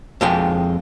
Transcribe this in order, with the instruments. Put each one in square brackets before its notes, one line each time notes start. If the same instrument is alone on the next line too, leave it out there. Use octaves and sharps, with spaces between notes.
[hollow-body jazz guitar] F2 G#3 G5